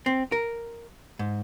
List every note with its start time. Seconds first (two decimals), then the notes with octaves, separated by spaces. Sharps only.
0.06 C4
0.32 A#4
1.19 G#2